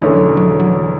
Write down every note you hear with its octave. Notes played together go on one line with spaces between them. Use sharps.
E1 E2 D3 E3 A3 C#4
F#3
E3
F#3
E3
F#3
E3